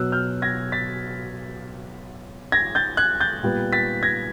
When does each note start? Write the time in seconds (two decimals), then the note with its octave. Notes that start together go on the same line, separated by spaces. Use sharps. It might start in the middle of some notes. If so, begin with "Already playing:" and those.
Already playing: B2 F#3 B3 E6 F#6
0.12 F6 G6
0.42 G#6 A#6
0.72 A6 B6
2.52 G#6 A#6
2.75 G6 A6
2.97 F#6 G#6
3.20 G6 A6
3.43 A#2 G3 B3
3.73 A6 B6
4.03 G#6 A#6